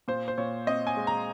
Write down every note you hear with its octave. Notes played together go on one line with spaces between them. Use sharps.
A#2 C5
C5
A#2 C#5
C4 D#5
G#5
G#3
A#5